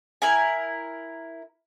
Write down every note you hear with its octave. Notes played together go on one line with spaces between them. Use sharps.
E4 A#4 G#5